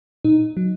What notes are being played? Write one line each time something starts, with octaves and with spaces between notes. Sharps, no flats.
A#2 D#4
F#3